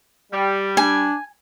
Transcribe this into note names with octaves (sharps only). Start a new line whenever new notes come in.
G3
D4 G#5